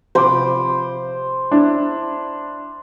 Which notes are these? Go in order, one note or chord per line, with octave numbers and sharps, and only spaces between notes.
C3 F3 C5 B5 D6
D4 E4